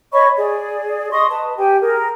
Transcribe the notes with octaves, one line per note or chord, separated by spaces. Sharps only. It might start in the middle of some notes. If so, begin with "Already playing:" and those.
C#5 D#5 B5 C#6
G#4 D5
D#5 C6 C#6 D#6
B4 A5
G4 G5 G#5
G#4 A#4